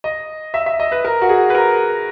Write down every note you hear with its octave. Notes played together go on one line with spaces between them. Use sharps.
D#5
E5
E5
D#5
B4
A#4
F#4
G#4
B4
A#4